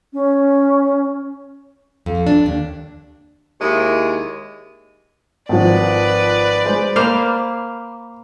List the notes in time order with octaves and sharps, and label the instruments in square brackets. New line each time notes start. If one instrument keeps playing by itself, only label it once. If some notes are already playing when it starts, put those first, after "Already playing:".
[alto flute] C#4
[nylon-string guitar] F2
D4
D#2
[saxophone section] D#2 G#3 E4
[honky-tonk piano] G#1 F3 [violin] B4 D5
[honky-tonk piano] G#3 C5
[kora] A#3 C5 F5 [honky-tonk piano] B5 D6